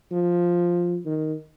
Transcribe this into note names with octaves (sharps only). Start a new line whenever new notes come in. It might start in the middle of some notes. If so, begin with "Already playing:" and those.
F3
D#3